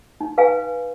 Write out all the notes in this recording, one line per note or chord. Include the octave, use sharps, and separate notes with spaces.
D#4
B4 F5 G#5